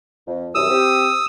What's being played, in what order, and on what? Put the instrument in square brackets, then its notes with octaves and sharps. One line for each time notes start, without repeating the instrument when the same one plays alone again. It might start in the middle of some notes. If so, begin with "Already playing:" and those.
[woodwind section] F2
[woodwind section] C2 F#2 E3 [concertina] D#6 E6
[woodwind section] C4 G4